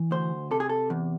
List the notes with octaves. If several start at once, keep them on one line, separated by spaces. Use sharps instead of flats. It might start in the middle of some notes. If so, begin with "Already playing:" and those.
Already playing: E3
D2 C5
C3 A4
G#4
A4
E2